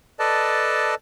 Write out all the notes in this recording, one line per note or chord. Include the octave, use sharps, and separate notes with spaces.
A4 B4 D5 D#5 A5